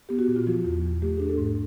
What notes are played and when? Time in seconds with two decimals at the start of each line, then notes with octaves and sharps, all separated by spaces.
0.09 B3 G4
0.19 F#4
0.28 A#2
0.36 F4
0.46 F3 F#4
0.65 E2
0.84 E2
1.02 A3 G4
1.17 D4 G#4
1.29 A4
1.38 G#2